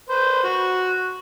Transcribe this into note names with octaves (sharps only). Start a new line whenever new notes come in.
B4 C5
F#4